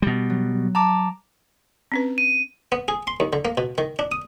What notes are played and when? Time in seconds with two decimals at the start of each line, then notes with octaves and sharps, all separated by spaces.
0.02 B2 G3
0.30 F#3
0.75 A5 A#5 D6
1.92 C4 C#4 B4
2.18 D#7
2.72 B3
2.88 G#4
3.07 C6
3.20 D#2
3.33 D3
3.45 A#3
3.58 B2
3.78 D#3
3.99 D4
4.12 D#6